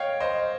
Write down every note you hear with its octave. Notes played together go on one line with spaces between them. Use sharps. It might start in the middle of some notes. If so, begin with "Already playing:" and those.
Already playing: C#5 D#5 F5 G5
C5 D#5